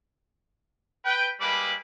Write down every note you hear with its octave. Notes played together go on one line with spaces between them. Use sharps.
B4 G5
G3 G#3 A#3 B4 B5 D6